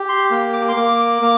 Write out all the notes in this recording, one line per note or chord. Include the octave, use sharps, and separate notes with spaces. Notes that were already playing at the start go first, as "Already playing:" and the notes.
Already playing: G4
C6
A#3
D6
C6
A#3 D6
A#3